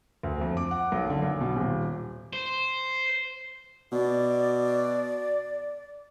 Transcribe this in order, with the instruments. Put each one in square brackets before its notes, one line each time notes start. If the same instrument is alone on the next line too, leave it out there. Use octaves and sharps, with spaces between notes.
[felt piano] D2
F2
D6
F#5
B1
D3
B1
B2
D#1
[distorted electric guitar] C5
[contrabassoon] B2 [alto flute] D5